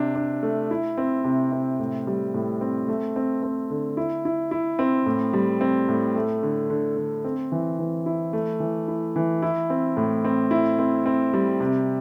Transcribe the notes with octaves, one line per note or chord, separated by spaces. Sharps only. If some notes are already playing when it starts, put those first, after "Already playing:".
Already playing: C3 D4
D4
A3
E4
C4
C3
C4
A2
G3
A2
C4
A3
C4
C4
D3
E4
E4
E4
C4
A2
G3
C4
A2
A3
D3
D3
D3
C4
E3
E3
E4
A3
E3
E4
E3
E4
C4
A2
C4
E4
C4
C4
G3
C3